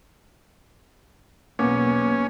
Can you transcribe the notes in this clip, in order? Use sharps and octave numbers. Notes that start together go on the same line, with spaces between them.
B1 E2 A#3 B3 C#4 D6